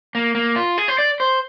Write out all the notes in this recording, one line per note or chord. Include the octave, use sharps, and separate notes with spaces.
A#3
A#3
F4
G#4
C5
D5
C5